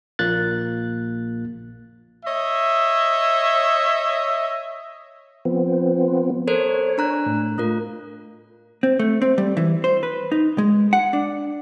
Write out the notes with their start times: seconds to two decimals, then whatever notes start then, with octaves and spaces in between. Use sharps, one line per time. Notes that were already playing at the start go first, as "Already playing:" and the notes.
0.19 A#1 A#2 A#3 F#6 A6
2.25 C#5 D#5 E5
5.45 F3 B3 C4
6.47 A4 A#4 C5 C#5
6.98 D4 A#5 F#6
7.26 A2
7.58 A3 F4 A#4
8.83 C4
8.99 A3
9.22 C4
9.38 G3
9.57 E3
9.84 C5
10.03 B4
10.32 D#4
10.58 G#3
10.93 F#5
11.13 D4